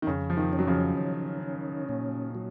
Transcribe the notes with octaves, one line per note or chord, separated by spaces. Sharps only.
D#3
F2 C#3
F3
D#3
C#4
F#3
C#3 F3
D#3
C#4
A#2
F#3